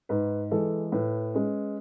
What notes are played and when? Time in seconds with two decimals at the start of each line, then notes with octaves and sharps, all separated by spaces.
0.09 G#2 B4
0.51 E3 G#3 A4
0.92 A2 B4
1.34 G#3 C#4